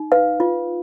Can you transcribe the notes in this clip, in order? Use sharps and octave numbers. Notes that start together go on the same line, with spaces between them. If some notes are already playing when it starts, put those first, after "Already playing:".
Already playing: D#4
B4 F5
F4